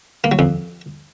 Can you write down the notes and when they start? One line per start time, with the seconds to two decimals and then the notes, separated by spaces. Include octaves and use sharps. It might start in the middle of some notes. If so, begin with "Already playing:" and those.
0.24 A#3
0.32 F#3
0.39 F2